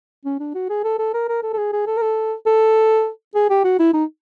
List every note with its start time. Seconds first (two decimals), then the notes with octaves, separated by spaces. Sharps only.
0.25 C#4
0.40 D4
0.55 F#4
0.69 G#4
0.84 A4
0.99 A4
1.14 A#4
1.29 A#4
1.43 A4
1.53 A4
1.58 G#4
1.73 G#4
1.87 A4
1.97 A#4
2.02 A4
2.46 A4
3.35 G#4
3.50 G4
3.64 F#4
3.79 E4
3.94 D#4